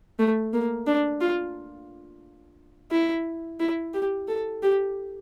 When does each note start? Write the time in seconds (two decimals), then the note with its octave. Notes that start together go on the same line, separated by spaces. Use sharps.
0.19 A3
0.54 A#3
0.87 D4
1.21 F4
2.91 E4
3.60 E4
3.94 G4
4.28 A4
4.63 G4